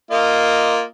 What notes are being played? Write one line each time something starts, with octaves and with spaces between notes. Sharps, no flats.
A#3 F4 D#5